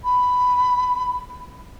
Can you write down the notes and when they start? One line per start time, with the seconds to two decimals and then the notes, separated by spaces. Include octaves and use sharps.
0.04 B5